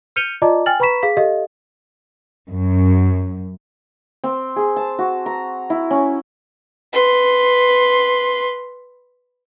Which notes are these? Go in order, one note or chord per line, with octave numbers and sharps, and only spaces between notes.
F6 G6 C#7 D#7 F7 G7
F4 D5 D#5 A5 A#5 D6
G5 G#5 F6 A6 F#7
B4 A#5 B5 C#6 B6 E7
G#4 F5 B6
G4 A4 D#5 F5
F#2
C4
G#4
A5
F#4
A#5
E4
C#4
B4 C6